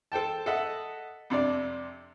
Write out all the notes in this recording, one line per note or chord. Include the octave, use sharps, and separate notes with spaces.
A4 C5 G5 A5
A4 D#5 E5 F#5
F2 C3 D4 D5